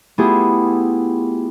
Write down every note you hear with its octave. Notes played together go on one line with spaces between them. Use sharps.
A3 B3 E4 F4 G4 G#4